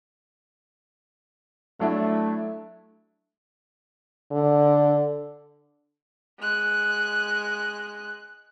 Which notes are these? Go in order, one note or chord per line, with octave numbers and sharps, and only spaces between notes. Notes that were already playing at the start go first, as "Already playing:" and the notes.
F#3 A3 D4 E4
D3
G#3 F#6